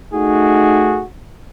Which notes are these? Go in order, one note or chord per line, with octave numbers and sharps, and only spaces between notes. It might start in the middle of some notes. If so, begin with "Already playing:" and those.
A3 D#4 F#4 G#4